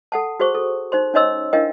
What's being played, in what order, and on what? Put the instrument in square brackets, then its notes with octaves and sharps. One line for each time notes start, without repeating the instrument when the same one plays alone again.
[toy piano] A4 F#5 A5
F#4 G#4 C5 C#6
A4
D#4 C5 C6
C#4 D#4 C#5 D#5 C6 E6
D4 E4 A#4 D#5 F5 G5